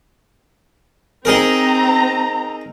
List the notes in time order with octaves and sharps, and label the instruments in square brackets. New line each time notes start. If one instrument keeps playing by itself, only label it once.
[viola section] C4 A#5 [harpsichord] D#4 G#4 A#4